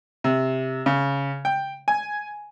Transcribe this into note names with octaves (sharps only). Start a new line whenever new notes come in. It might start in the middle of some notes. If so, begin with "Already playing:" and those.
C3
C#3
G5
G#5